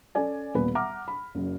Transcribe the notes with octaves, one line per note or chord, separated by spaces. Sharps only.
C#4 A4 D5 G#5
D#1 A#2 B3 B4
E5 F#5 A#5 D6 F6
B5
F#1 F#2